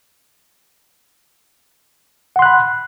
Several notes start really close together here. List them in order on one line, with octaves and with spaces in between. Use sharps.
F#5 C6 F#6 B5